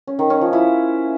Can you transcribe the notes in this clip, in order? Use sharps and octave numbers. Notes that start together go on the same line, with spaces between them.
C#4
D#3
C#4
F3
E4